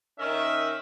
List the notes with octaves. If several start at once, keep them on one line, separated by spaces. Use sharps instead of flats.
D#3 C#4 D#4 A#4 E5